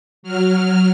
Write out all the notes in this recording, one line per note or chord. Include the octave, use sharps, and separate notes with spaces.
F#3 F6